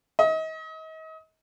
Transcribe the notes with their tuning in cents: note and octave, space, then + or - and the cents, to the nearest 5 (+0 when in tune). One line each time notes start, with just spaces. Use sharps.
D#5 +35